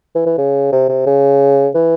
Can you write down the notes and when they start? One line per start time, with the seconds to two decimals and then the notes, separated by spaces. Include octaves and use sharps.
0.15 E3
0.26 E3
0.38 C#3
0.72 C3
0.89 C3
1.06 C#3
1.74 E3